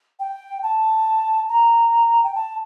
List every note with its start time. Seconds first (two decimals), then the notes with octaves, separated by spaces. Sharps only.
0.20 G5
0.63 A5
1.49 A#5
2.24 G5
2.35 A5